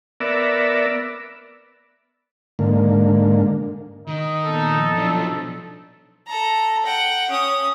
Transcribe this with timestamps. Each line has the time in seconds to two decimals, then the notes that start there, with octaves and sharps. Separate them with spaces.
0.20 B3 A#4 D5 E5
2.59 G#2 D3 A#3
4.07 D#3 D#4
4.46 A#2 B3 A4
4.95 B1 F3 D4 E4
6.27 A4 A#5
6.85 F#5 G5
7.30 C#4 D#6